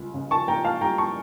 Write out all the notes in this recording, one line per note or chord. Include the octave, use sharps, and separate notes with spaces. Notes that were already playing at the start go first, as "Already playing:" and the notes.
Already playing: C#2 G3
C#3
A5 C#6
A#3 G5 A#5
F5 A5
G3 G5 A#5
A5 C#6